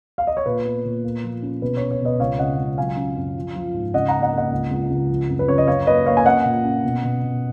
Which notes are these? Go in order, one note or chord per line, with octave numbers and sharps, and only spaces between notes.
F5
D#5
C#5
A#2 B4
B3
A#2
A#3
F3
C#4
B2 B4
C#4 C#5
C#5
B2 B4 D#5
C#2 C#5 F5
C#3 D#5 F#5
C#2
F#3 F5 G#5
C#4
F#2
F3
F3
G#2
C#3 D#5 F#5
F#5 A#5
A#3
D#5 F#5
A#3 D#5 F#5
C#2
C#2
C#2
F3
F#2
B4
C#3 C#5
D#5
F#2 C#5 F5
A#3 B4 D#5
A#3 C#5 F5
G#5
C#4 D#5 F#5
A#2
C#4
B2
B2
B2